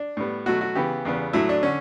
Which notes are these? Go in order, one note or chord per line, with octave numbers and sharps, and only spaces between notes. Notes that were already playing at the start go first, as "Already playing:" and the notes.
Already playing: D4
A2 G3 B3
B2 F#3 A3 F#4
F#4
C#3 E3 B3 G4
E2 C#3 G3 B3
A2 F#3 A3 E4
D4
D3 C#4